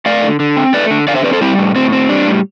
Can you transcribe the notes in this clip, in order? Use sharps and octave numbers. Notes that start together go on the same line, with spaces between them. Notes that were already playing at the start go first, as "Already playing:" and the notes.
A3 D5 F5
D3
D3
C4
A3 B4 D5
D3
D3 D5 F5
C5 E5
C4 B4 D5
A4 C5
G3 C4 E4
A2
A2 C4
C4
G3 D4
A2